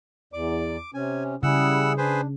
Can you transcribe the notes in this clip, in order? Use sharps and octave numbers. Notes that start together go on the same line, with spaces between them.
E2 D5 D6
C3 C#4 G#5
C#3 G3 E4 G#4 F#5 E6
D4 G#4 B4 C5